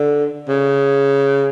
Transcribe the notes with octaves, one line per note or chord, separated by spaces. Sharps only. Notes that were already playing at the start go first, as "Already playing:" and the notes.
Already playing: D3
C#3